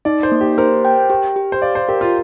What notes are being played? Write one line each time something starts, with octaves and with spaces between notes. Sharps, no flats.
D#4 D5
C5
A#3
G4
A#4 C5
G5
G4
G4
C5
D5 F5
C5
G4 A#4
F4